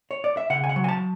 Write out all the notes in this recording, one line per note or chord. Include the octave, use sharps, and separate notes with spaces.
C#5
D5
E5
C#3 F#5
G#5
F#5
F#3
G#5
A5